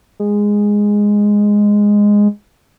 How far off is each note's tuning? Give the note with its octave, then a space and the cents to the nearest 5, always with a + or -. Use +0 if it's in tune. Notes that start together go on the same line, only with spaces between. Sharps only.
G#3 -10